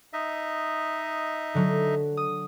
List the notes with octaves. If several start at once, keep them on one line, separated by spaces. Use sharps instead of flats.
D#4 D#5 E5
D3 F#3
D#6